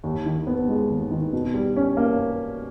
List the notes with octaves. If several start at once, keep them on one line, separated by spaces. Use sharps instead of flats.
D#2
D#3
B3
G#3
D#2
D#3
B2
G3
C#4
A#3